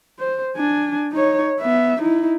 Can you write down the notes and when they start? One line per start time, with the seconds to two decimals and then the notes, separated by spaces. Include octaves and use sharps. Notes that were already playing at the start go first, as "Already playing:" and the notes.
0.19 C5
0.56 D4 G#5
1.12 D#4 C#5
1.60 B3 E5
2.00 D#4 E4